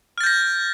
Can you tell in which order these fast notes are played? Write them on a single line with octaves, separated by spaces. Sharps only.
F6 A6 G6 A#6